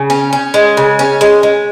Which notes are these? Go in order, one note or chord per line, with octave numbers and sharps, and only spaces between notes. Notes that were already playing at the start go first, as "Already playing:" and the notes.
Already playing: C#3
C#4
C#4
G#3
C#3
C#4
G#3
G#3